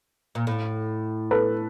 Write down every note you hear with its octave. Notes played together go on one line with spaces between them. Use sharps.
A#2
A2
A4 B4